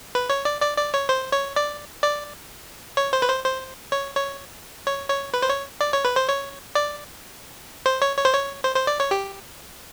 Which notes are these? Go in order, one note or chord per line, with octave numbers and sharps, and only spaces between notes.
B4
C#5
D5
D5
D5
C#5
C5
C#5
D5
D5
C#5
C5
B4
C5
C5
C#5
C#5
C#5
C#5
B4
C5
C#5
D5
C#5
B4
C5
C#5
D5
C5
C#5
C#5
C5
C#5
C5
C5
D5
C#5
G4